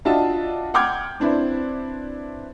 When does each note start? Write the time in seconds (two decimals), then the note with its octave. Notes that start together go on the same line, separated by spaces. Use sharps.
0.05 D4 F4 F#4 D#5 E5 A5
0.74 F#5 G5 D6 F6 G6 G#6
1.20 C4 D4 E4 B4 C5